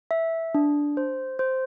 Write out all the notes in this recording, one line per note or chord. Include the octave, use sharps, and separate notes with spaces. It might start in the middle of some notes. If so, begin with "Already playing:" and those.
E5
D4
C5
C5